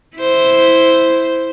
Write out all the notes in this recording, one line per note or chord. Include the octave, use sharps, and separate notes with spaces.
E4 C5